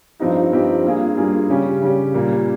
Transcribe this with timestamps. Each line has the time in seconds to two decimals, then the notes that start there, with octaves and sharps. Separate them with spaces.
0.20 G2 F3 C4 D#4 G4
0.52 G2 F3 C4 D#4 G4
0.84 G2 G3 A#3 F4 G#4
1.17 G2 G3 A#3 F4 G#4
1.50 C#3 G3 C#4 G4
1.81 C#3 G3 C#4 G4
2.14 A#2 G3 A#3